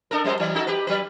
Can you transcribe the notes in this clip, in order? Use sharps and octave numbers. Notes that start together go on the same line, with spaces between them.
D4 A4 A#4
F#2 G3 C5
E3 F#3
D#4 F#4 A4
G4 B4
F#3 B4